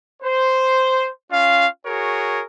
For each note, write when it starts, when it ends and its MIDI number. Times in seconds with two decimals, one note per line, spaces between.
0.23 1.07 72
1.30 1.66 61
1.30 1.66 65
1.30 1.66 77
1.85 2.43 66
1.85 2.43 68
1.85 2.43 70
1.85 2.43 73